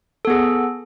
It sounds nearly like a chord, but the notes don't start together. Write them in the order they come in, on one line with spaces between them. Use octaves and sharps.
A4 B3 G#4